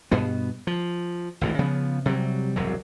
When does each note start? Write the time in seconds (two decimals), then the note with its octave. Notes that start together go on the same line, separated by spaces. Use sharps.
0.11 G2 B2 B3
0.67 F3
1.41 G#1 D2 A2 E3
1.59 C#3 F3 B3
2.06 C3 F#3 G3
2.56 E1 C2 G2 F#3